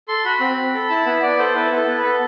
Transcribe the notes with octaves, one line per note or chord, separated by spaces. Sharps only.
A4 C6
F#4 B5
C4
C4
A4
E4 A5
B3 B5
B3 D5
A4 C5
E4 B4
B3
A4
B3
B4
A4